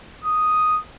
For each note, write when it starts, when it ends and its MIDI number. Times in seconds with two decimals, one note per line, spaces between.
0.24 0.79 87